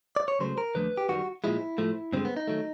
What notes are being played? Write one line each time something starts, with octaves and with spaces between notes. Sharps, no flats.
D5
C#5
C#2 C#3 F#3 A3 C5
A#4
D#2 D3 F3 A3 B4
G4
F#2 D#3 G3 F#4
A#2 F3 G#3 E4
A2 F3 A3
G2 D3 F3 G#3 C4
B3
D#4
D#3 F#3 A3